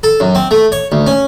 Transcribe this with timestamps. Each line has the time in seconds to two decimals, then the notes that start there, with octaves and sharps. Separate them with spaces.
0.03 A4
0.20 F#2
0.35 C4
0.51 A3
0.72 C#5
0.92 D2
1.07 C#4